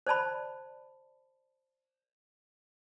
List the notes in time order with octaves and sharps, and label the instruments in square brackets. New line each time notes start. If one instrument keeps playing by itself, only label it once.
[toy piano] C5 D5 A5 B5